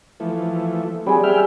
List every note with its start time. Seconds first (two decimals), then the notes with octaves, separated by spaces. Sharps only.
0.20 E3 F3 A3
1.06 F#3 G3 C4 G#4
1.24 E5 G5 F6